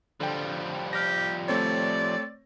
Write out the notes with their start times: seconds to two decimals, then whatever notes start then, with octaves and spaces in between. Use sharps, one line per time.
0.20 D3 F3 G3 G5
0.93 G4 F6 A#6
1.48 A3 C4 C#5 D5